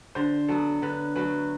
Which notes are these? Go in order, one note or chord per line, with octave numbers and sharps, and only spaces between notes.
D3 C5
F#3 B3 A4
D3 B4
F#3 A3 B4